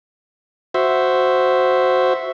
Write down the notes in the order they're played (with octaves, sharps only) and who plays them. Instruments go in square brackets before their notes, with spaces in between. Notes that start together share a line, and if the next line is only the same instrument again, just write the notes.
[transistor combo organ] F#4 C5 E5